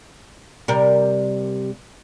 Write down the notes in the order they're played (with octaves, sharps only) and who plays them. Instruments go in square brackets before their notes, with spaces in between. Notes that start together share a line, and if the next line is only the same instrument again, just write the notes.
[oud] C3 G3 A#4